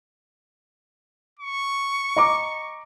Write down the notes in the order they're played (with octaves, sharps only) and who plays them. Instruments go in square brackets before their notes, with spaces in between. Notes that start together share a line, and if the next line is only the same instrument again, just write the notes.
[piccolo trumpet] C#6
[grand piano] D#5 A#5 D6